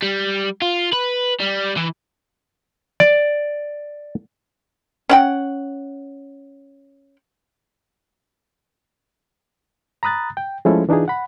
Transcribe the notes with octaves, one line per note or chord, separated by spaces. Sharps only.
G3
F4
B4
G3
E3
D5
C#4 F#5 G5
A#5 B5 D#6 F#6 A6
G5
F3 G#3 A3 C#4 E4 A4
E3 D4 D#4 F4 G#4
F#5 B5